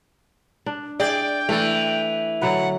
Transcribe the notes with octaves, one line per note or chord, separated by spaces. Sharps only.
D4
G#4 D5 G5
E3 A3 A4
D3 F#3 B4 F#5